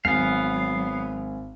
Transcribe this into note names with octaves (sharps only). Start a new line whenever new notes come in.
G#1 F#3 B3 F5 G#5